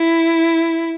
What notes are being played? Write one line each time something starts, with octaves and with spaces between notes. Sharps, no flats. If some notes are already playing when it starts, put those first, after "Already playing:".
Already playing: E4